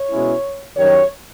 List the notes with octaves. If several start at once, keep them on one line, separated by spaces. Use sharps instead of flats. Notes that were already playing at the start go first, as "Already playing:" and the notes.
Already playing: C#5
B2 G#3 C#4 E4
F#2 D#3 G3 C#5